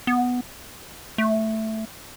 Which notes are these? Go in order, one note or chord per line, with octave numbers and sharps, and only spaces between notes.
B3
A3